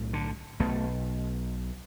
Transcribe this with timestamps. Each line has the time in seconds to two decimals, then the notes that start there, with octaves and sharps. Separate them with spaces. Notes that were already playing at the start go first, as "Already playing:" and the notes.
Already playing: B1 A2
0.13 D3
0.59 B1 B2 A3